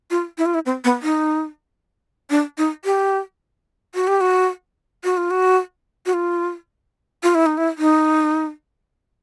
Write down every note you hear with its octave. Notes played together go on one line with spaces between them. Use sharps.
F4
E4
F4
E4
C4
B3
D#4
D4
D#4
G4
F#4
G4
F#4
F#4
F4
F#4
F#4
F4
F4
E4
D#4
E4
D#4